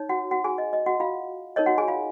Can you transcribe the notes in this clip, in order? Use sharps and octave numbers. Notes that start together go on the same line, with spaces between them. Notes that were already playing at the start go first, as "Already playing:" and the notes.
Already playing: D#4 C#5
F#4 F#5
F#4 F#5
G#4 G#5
D#5
D#5
F#4 F#5
F4 F5
D#4 A#4 C#5 D#5
F#4 F#5
G#4 G#5
F4 F5